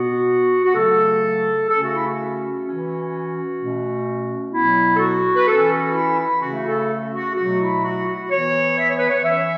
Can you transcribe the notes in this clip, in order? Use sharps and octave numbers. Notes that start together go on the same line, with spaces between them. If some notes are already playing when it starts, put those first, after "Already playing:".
Already playing: B2 B3 F#4
F#4
C#3 F#3 A3 A4
C#3 A3 C#4 A4
F#4
E4
F#4
E3 C#4
B2 A3 C#4
B2 F#3 B3 E4
A4
F#4
B4
E3 C#4 A4
F#4
E4
E4
C#3 A3 C#4 F#4
A4
F#4
B2 F#3 A3 F#4
E4
F#4
F#4
E3 B3 C#5
E5
C#5
B4
C#5
E3 C#4 E5